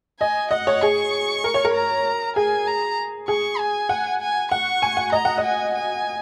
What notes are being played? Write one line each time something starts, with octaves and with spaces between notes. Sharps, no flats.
D#5 G#5
D#5 F#5
C#5
G#4 C#6
A#4
C#5
A#4
A#5
G#4 G#5
A#5
G#4 C#6
G#5
F#5
G#5
F#5 C#6
G#5
F#5
D#5 A#5
F#5
D#5
G#5
G#5